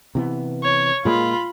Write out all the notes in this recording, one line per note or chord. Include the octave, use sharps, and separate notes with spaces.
C3 E3 B3
C#5
A#2 G#3 A#3 F4 B5